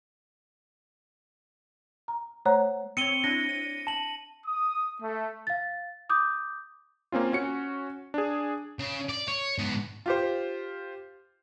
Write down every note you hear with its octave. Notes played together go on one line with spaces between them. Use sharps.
A#5
A3 C5 C#5 F#5 A#5 F#6
C4 C#5 C#7 D#7 G7
D4 E4 A#6 D#7
D#7
A5 F#7
D#6
A3
F5 A6
D6 D#6 G6
A#3 C4 C#4 F4
C#4 F#4 C#7
D4 G#4
C#3
D5
C#5
G#2 B3
F4 G4 C5